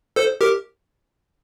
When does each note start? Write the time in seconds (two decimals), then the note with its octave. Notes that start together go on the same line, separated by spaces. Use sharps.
0.16 A4 C5
0.41 G4 A#4